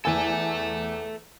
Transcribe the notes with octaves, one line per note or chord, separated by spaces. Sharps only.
E2 A4 E5 G#5